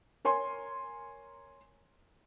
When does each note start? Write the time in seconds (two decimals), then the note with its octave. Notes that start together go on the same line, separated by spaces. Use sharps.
0.25 A#4 C#5 G#5 C6